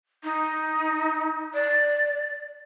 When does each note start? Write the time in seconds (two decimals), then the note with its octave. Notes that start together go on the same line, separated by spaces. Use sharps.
0.24 D#4
1.54 D5